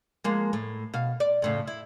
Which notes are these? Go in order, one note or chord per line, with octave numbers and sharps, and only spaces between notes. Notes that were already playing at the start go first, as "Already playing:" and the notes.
F3 G#3 A#3
A2
B2 F5
D5
F2 A2 C#3
E4